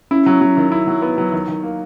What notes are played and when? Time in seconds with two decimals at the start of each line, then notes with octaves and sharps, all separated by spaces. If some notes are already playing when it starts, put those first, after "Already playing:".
0.11 C#4 E4
0.26 F#3
0.41 F#3
0.57 D#3
0.72 E4
0.87 F#3
1.02 B3
1.18 F#3
1.32 D#3
1.48 D#3
1.63 A#3